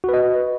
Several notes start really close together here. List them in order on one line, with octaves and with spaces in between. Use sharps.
F#4 B4 D#5